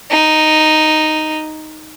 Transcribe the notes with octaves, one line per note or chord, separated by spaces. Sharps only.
D#4